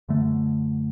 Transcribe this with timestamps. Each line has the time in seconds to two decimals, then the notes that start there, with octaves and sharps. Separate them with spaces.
0.09 F#2 D3 A3